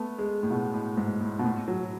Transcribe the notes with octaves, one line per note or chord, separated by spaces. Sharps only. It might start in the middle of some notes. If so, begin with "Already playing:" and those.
Already playing: A3 B3
G#3
A2
B2
A2
G#2
A2
B2
A2
F#3